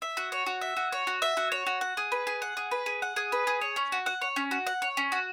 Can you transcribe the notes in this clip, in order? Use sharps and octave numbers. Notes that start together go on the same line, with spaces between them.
E5
F#4
C#5
F#4
E5
F#4
C#5
F#4
E5
F#4
C#5
F#4
F#5
G#4
B4
G#4
F#5
G#4
B4
G#4
F#5
G#4
B4
G#4
C#5
C#4
F#4
F#5
C#5
C#4
F#4
F#5
C#5
C#4
F#4